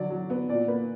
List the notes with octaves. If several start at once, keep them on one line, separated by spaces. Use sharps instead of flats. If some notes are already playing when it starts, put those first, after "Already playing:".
Already playing: D3 F#3 D5
F#3
B3
A#2 D5
A#3 B4